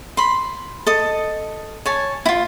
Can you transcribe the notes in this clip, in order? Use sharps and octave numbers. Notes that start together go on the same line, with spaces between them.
B5 C6
A4 D#5
C#5 G#5 A5
E4 F4